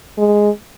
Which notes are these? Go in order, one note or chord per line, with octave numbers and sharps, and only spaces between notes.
G#3